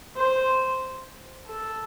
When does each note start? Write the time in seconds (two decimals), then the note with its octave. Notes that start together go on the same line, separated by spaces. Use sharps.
0.16 C5
1.47 A4